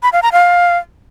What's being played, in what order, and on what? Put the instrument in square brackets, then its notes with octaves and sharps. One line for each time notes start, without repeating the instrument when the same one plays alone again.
[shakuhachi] B5
F5
A#5
F5